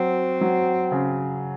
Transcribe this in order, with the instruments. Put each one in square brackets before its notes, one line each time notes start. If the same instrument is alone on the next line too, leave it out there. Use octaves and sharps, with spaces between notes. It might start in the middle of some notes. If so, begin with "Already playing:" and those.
Already playing: [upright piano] F#3 [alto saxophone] C4
[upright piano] F#3
C#3